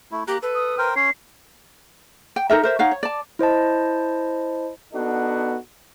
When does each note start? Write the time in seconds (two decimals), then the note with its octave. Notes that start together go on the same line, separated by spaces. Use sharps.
0.12 A3 E4
0.28 A#3 G4 A#5 F#6
0.42 A4 B4
0.55 D#6
0.78 A#4 C5 G5 F6
0.96 C#4 C#5 C7
2.36 G5
2.50 D#4 A4 A#4 E5
2.63 A#4 C5 E5
2.79 D#4 C#5 F5 F#5
2.91 C#5
3.03 D5 A5
3.39 E4 C5 D#5 A5
4.93 B3 D4 D#4 F#4 A4